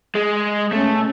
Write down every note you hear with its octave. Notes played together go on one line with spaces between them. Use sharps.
G#3
B2 G#3 A3 C#4